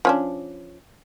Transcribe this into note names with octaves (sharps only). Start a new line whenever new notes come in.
F3 C#4 D4